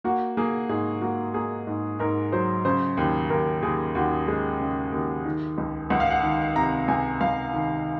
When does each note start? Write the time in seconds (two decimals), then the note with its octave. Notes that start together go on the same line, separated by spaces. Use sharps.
0.04 A#3 F#4
0.37 A#3 G#4
0.69 G#2 G#4
1.02 A#3 F#4
1.34 A#3 G#4
1.67 G#2
1.99 G#2 A#4
2.32 F#3 C5
2.65 C#3 C5
2.97 D#2
3.30 D#2 A#4
3.63 D#2 G#4
3.95 D#2 F#4
4.27 G#3 G#4
4.60 C#3
4.93 D#2
5.25 D#3
5.58 C#2
5.90 C#2 F#5
6.00 F5
6.10 F#5
6.23 D#3
6.55 C3 A#5
6.88 C#2 G#5
7.21 C#2 F5
7.54 D#3